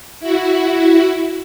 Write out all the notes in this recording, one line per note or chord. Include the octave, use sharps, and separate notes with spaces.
E4 F#4